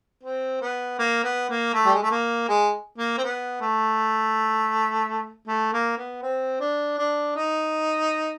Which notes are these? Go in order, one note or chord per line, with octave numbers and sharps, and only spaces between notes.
C4
B3
A#3
B3
A#3
A3
G3
G#3
A3
A#3
G#3
A#3
C4
B3
A3
A3
A#3
B3
C4
D4
D4
D#4